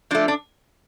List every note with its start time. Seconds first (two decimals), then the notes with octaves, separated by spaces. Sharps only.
0.11 F3 A3 D4
0.28 D4